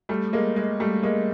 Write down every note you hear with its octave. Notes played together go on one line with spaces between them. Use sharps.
G3 A3
G#3 A#3
G#3
G3 A3
G#3 A#3